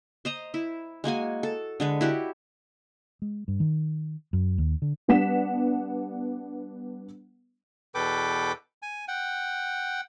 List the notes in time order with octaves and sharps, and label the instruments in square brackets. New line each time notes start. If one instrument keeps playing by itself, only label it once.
[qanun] C5 D#5 A#5
E4
G#3 A#3 F#4 G#5
A4
D3 G#3 B4
E4 F#4 G4
[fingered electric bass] G#3
G2
D#3
F#2
D#2
D3
[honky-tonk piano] G3 B3 D4 F#5 B6 E7
[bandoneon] E2 B2 A4 B4 G5 D6
G#5
F#5 G5